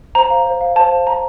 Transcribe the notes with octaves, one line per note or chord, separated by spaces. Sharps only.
C5 A#5
F5
C5
F5
C5 A5
F5
C5 A#5